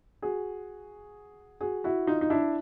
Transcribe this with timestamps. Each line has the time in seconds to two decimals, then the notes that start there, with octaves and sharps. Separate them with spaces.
0.22 F#4 G#4
1.61 F#4 G#4
1.84 E4 F#4
2.07 D#4 F4
2.21 D#4
2.30 D4 E4